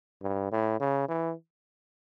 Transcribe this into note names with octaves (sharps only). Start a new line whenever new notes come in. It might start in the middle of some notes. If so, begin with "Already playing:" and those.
G2
A2
C#3
E3